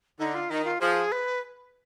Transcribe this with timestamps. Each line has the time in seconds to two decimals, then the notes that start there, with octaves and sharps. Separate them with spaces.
0.19 D3 D#4
0.34 F4
0.50 D#3 D#4
0.65 F4
0.81 F3 G#4
1.12 B4